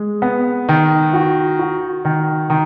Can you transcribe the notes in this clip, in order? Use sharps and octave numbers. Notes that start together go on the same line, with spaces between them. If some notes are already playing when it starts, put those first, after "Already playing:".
Already playing: G#3
B3
D#3
F#4
F#4
D#3
D#3